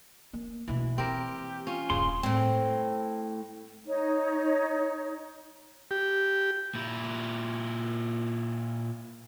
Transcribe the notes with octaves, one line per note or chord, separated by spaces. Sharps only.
A#3
D2 B2 E3
E3 A#3 C4 G4 A#4
C#4 F4
D#1 G2 C#3 C6
A2 C4
D#4 C#5
G4
A#2 E4